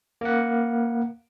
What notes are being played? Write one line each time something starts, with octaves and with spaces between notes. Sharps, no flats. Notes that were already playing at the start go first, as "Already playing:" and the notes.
A#3 F#5